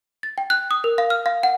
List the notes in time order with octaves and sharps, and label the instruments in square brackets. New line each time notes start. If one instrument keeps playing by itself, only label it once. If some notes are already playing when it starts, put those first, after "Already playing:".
[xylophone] A6
G5
F#6
D#6
A#4
F5
F6
F5
F#5